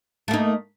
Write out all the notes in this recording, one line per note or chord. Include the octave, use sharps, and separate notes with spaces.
A3 A#3 D#4